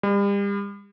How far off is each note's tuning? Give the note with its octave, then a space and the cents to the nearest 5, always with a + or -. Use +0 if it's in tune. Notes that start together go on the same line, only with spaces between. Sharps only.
G3 +40